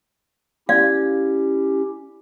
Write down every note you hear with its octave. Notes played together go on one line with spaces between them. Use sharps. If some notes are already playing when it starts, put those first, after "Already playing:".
C#4 E4 G4 D5 F5